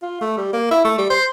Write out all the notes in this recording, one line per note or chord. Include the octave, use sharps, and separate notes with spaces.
F4
A3
G3
A#3
E4
A3
G3
C5